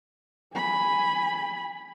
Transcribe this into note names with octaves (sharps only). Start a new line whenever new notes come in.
G#5 B5